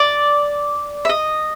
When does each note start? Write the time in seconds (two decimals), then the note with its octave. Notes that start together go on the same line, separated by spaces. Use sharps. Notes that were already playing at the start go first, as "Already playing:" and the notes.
Already playing: D5
1.05 E5
1.09 D#5